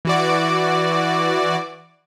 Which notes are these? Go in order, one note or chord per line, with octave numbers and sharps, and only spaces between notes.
E3 F#4 D5